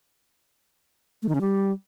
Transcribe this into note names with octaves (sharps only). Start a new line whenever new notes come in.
A3
D#3
C#3
G3